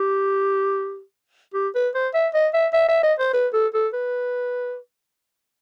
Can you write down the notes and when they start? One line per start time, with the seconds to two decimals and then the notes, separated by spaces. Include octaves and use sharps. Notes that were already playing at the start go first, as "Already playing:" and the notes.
Already playing: G4
1.54 G4
1.75 B4
1.95 C5
2.14 E5
2.34 D#5
2.53 E5
2.73 E5
2.88 E5
3.03 D#5
3.19 C5
3.34 B4
3.53 A4
3.74 A4
3.93 B4